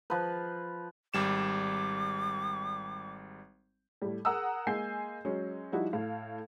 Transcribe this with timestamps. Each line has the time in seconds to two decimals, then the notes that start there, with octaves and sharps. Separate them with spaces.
0.10 F3 B4
1.14 G#1 G3 D6 E7
4.02 A2 G3
4.25 G#4 A#4 F#5 A#5 D#6 E6
4.67 G#3 A#3 G#5 G6 C7
5.25 F#3 G#3 C#4
5.72 F3 G3 D#4 E4 F#4
5.93 A2 F5